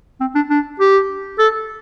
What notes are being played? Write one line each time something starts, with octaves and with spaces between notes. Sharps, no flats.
C4
D4
D4
G4
A4